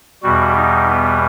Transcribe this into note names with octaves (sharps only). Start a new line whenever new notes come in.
E2 B2 G3 F#4
D#4
B3